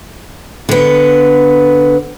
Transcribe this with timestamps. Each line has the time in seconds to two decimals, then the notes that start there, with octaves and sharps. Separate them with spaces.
0.69 D3 B3